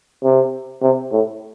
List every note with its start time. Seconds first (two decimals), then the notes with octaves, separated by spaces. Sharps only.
0.23 C3
0.83 C3
1.12 A2